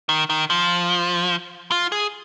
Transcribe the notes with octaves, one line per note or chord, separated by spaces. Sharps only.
D#3
D#3
F3
F4
G#4